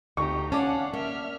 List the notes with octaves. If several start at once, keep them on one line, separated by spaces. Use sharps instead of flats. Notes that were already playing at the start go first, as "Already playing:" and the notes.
D2 D#4 G4 C#6
C#4 D5 F5 F#5 A5
A#3 E5 F6